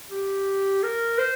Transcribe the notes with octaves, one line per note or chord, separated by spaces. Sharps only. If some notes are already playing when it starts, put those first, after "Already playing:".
G4
A#4
C5